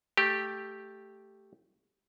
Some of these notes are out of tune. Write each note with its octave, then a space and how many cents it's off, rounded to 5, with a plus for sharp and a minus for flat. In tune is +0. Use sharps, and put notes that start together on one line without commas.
A3 -5 G4 +0